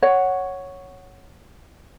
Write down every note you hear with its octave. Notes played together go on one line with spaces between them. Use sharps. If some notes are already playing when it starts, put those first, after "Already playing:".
C#5 F#5